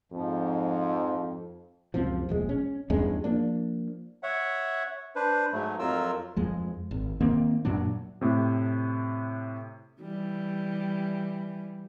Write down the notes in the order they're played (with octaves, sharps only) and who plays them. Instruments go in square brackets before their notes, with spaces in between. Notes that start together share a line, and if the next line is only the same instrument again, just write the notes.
[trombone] F2 [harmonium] G#2 F3
[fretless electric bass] C#2 F#2 C3 F3
E1 A#1 G#3
C#4
E2 G2 G#3 C#4
F3 A#3 D4
[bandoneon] C#5 E5 F#5
D4 B4 C5
G#2 F#3 A3
F2 F#3 F4 A#4 E6
[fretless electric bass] F2 F3 G#3
G#1
D#3 A#3 C4
F#2 A#2 F#3 D4
[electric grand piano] A2 C3
[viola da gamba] E3 G3